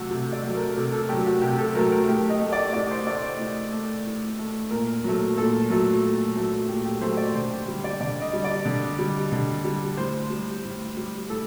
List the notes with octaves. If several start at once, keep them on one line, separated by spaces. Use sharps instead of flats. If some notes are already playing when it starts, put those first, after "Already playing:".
Already playing: C3 F#3 A3 F#4 A4
C3
D5
F#3 A3
A#4
C3 A4
A4
F#3 A3 G4
F#4
C3 G4
A4
F#3 A3 A#4
A#4
A2 G4
D#5
A3
D5
A2 D5
C5
A3 D5
C5
A2
A3
A2
A3
A#2 A#4
F#3 A3
A#2 A4
F#3 A3
A#2
F#3 A3
A#2 G4
G4
F#3 A3 C5
D5
D3 C5
G4
G3 G4
D5
D3 D5
D#5
G3
D5
D3
G3
D3
G3
A2 C5
G3
A2
G3
A2 A4